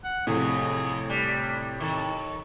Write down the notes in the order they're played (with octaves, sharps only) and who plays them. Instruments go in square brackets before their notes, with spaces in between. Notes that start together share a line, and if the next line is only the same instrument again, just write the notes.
[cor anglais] F#5
[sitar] F2 [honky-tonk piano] A2 C3 [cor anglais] G#4
[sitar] G3 [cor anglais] D4
[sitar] D#3 A4 [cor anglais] C#5